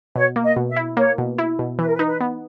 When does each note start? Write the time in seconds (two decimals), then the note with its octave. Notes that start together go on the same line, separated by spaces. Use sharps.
0.16 B2 C#5
0.36 A#3
0.43 D#5
0.56 B2
0.69 E5
0.76 E4
0.97 A#3 C#5
1.18 B2
1.38 E4
1.59 B2
1.79 E3 B4
1.87 A#4
1.94 B4
1.99 D#4
2.07 B4
2.21 B3